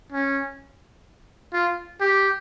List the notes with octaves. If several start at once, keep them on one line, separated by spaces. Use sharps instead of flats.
C#4
F4
G4